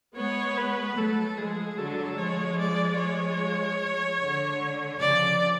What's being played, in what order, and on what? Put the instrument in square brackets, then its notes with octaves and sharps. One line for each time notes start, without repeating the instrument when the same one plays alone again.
[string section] G#3 B3 [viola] C#5
[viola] B4
[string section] F#3 A3 [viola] A4
[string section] F3 G#3 [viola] G#4
[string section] D3 F#3 [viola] A4
[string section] F3 G#3 [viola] C#5
[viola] D5
C#5
[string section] D3
[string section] C#3 F3 [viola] D5